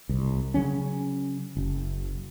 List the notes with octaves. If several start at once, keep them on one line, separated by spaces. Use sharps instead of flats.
C2
C#3 F#3 C#4
F#1